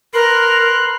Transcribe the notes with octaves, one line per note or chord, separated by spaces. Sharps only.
A#4 B4 C6 F#6